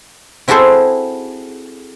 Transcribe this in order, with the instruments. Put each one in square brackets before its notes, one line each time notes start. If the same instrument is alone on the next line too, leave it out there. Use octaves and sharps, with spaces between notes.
[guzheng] C4 E4 F#4 G#4 A4 C5